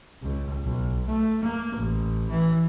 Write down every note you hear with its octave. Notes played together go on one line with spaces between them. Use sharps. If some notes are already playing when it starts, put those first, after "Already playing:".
C#2
B1
A3
A#3
A1
E3